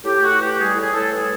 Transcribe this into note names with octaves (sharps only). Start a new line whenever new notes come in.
A2 G4
A2 F#4
E3 G4
G3 G#4
A2 G#4
A2 A4
E3 G#4